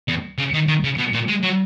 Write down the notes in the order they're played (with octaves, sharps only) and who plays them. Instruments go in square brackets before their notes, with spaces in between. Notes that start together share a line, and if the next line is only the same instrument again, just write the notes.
[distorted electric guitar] E2
C#3
D#3
D#3
C#3
B2
A#2
G#3
F#3